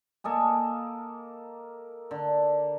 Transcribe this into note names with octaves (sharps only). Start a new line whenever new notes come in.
A#3 A4 D#5 G#5
D3